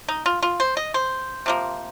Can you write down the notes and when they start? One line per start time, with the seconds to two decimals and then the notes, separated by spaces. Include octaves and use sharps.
0.08 D#4
0.26 F4
0.42 F4
0.60 C5
0.77 D#5
0.94 C5
1.46 C3 F3 A#3